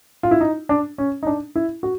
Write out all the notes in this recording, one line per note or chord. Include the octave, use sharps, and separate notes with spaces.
F4
E4
D#4
D4
C#4
D#4
D4
E4
F#4